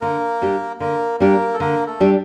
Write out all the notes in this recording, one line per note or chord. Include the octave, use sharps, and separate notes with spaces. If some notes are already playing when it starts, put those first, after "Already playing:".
D3 A#3 A#4
G3 D4 G4
D3 A#3 A#4
G3 A#3 D4 G4 A#4
A4
D3 A#3 A#4
A3 A4
G3 D4 G4